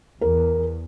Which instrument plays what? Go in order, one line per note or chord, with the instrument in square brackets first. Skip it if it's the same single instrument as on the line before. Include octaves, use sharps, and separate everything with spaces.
[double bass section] E2 [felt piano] A#4